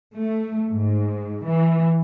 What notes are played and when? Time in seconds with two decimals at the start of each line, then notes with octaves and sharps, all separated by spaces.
0.14 A3
0.70 G#2
1.46 E3